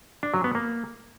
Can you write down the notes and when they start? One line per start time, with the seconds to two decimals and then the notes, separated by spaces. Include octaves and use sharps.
0.23 D4
0.34 F#3
0.44 B3
0.55 A#3